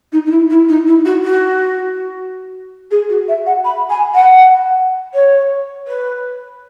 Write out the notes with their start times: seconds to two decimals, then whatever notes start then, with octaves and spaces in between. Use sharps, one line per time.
0.12 D#4
0.26 D#4
0.31 E4
0.50 E4
0.69 D#4
0.87 E4
1.05 F#4
1.24 F#4
2.91 G#4
3.09 F#4
3.28 E5
3.46 F#5
3.65 B5
3.90 G#5
4.15 F#5
5.14 C#5
5.88 B4